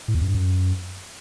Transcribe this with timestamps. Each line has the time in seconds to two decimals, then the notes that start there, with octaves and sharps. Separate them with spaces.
0.08 A2
0.15 E2
0.21 F#2
0.28 G2
0.35 F#2